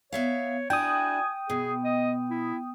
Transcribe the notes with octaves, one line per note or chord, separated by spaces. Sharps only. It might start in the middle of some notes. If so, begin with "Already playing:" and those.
B3 C#5 E5 F5
D4 E4 F#4 G5 G#5 D#6
B2 G#4
D#5
E4